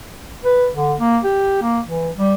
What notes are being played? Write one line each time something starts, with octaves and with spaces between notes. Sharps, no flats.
B4
D3
A#3
G4
A#3
E3
G3